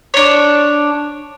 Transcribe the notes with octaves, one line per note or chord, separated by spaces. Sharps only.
D4 C#5